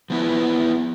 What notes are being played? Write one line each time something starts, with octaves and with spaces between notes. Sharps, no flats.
F3 B3 E4 B4